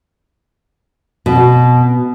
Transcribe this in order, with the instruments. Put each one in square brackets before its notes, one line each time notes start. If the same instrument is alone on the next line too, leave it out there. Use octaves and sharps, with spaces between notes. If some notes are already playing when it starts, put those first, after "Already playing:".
[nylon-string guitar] B2